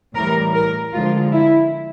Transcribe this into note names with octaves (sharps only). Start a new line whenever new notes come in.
A2 E3 G3 A#4
A#4
D3 F3 G#3 F4
E4